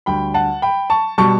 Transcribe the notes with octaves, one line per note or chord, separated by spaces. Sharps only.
D2 D3 G3 G5 B5
F#5 A5
G5 B5
A5 C#6
B2 G3 A5 C#6